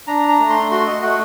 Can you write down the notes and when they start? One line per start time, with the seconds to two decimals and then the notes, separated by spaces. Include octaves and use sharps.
0.07 D4 A#5
0.28 A#5
0.39 A3
0.49 C6
0.71 F#4 C6
0.87 D#5
1.02 A3 F#5